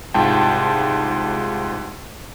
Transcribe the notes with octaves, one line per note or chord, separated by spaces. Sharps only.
C2 G#2 F4 G5 A5